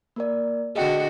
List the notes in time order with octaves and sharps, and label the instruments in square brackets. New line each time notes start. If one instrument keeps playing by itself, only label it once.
[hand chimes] A#3 A#4 D5
[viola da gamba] D3 F#4 [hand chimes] G#4 D#5 G5